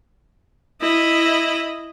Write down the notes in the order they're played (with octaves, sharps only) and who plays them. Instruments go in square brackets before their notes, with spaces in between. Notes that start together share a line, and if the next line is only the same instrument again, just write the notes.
[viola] E4 D#5